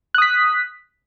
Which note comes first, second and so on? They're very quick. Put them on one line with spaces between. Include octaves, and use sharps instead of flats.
F#6 D#6 B6